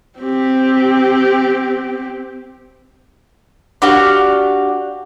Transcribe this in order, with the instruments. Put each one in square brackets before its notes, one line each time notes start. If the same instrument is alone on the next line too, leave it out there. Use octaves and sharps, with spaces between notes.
[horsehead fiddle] C4 G4
[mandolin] D4 F#4 G4 F5